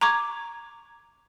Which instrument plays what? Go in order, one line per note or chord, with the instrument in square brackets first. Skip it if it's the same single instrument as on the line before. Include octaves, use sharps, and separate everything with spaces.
[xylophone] A#5 C#6 D6 G#6